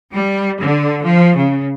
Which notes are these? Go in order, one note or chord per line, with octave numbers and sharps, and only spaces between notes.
G3
D3
F3
C#3